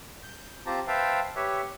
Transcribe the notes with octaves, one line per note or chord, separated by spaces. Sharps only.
G6
C4 F4 G4 C5 A5 A#5
B4 C5 E5 F5 G5 A5
G4 B4 C#5 E5